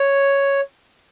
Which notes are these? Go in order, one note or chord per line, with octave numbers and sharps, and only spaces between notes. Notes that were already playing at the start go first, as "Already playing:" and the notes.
Already playing: C#5